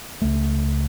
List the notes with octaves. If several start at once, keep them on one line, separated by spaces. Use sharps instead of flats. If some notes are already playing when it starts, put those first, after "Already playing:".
C#2 A3